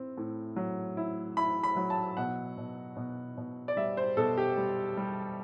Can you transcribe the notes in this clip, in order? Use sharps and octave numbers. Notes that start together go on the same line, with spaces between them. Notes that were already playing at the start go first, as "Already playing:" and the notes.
Already playing: C4 E4
A2
F#3
E4
E4 B5
B5
F#3
A5
B2 F#5
B2
B2
B2
D5
G3 E5
C5
B2 A4
G4
G3
G3